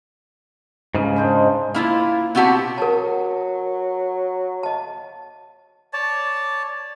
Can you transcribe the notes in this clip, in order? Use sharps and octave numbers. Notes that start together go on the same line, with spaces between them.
G#2 C#3
D4 C5 D#5
A#3 E4 F4
B2 C4 F#4 G4 A5
F#3 A#4 A5
D#5 A5
C#5 D5 A5